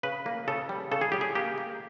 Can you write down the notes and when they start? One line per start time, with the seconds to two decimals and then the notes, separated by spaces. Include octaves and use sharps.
0.03 C#3 B4
0.26 A#3
0.48 C#3 A4
0.69 G3
0.91 C#3 A4
1.01 G#4
1.12 G3 G4
1.21 G#4
1.35 A#3 G4
1.58 A#3